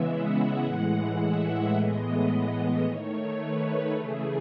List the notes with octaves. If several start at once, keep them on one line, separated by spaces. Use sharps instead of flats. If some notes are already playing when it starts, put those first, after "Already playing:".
Already playing: C#3 E3 G#3 B3 E5
F#5
A2 E3 G#3
E5
A2 E3 G#3 B3 D#5
D#3 A3 C#5
B4
C#3 E3 A3 G#4